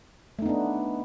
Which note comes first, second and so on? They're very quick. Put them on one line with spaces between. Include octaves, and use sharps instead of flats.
A3 D#4 B3 D4